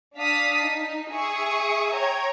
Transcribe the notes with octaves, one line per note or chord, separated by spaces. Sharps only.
D4 F5 A5 D#6 B6
D#4
G#4 E5 C#6 D#6
C#5 G5 A#5 G#6